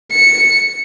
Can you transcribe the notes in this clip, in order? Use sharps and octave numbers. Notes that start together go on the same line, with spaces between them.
C#7